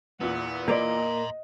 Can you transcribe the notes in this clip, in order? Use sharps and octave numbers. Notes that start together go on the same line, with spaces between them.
E2 A#2 B3 F#5
A#3 B4 D5 D#5 A#5 C6